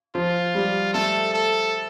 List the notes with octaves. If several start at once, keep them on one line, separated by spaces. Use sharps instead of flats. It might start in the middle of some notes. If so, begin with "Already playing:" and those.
F3 F4
G3
A3 A4
A4